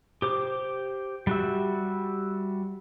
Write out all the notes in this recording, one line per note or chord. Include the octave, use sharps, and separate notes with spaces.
G4 C5 D6
G3 F#4 E5